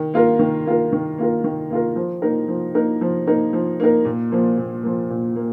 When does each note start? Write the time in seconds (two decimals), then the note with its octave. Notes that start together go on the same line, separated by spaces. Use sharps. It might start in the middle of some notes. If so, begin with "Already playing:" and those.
Already playing: D#3
0.14 A#3 F4 A#4
0.39 D#3
0.66 A#3 F4 A#4
0.93 D#3
1.18 A#3 F4 A#4
1.44 D#3
1.70 A#3 F4 A#4
1.96 F3
2.22 A#3 D#4 A#4
2.48 F3
2.74 A#3 D#4 A#4
3.01 F3
3.27 A#3 D#4 A#4
3.53 F3
3.80 A#3 D#4 A#4
4.05 A#2
4.32 F3 A#3
4.58 A#2
4.83 F3 A#3
5.10 A#2
5.36 A#3